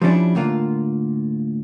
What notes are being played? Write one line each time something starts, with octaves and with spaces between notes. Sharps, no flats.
F3 G3 C#4 D4 E4
A2 D3 A#3 F4